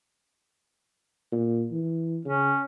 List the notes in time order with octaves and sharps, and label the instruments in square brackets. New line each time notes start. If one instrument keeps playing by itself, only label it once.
[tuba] A#2
E3
[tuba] C#3 [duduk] C#4